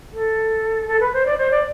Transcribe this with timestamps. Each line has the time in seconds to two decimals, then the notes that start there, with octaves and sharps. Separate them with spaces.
0.13 A4
0.88 A4
1.00 B4
1.13 C5
1.26 D5
1.38 C5
1.51 D5